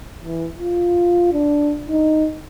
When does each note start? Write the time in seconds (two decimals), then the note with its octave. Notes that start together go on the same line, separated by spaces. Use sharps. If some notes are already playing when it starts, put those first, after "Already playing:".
0.23 E3
0.58 F4
1.33 D4
1.89 D#4